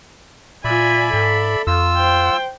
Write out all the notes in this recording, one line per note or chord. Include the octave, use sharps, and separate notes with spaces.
A#2 F4 D5 E5 G#5 B5
G#2 A4
F2 F4 E6
C5 G5